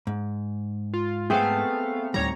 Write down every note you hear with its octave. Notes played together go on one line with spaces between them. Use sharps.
G#2
F4
A3 B3 C4 G#4 F5
D2 A2 D#3 G3 C#5 A#5